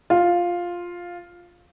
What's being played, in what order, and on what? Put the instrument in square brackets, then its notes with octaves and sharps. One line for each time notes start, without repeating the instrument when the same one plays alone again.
[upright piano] F4